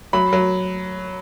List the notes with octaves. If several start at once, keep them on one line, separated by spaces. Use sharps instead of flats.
F#3 B5
F#3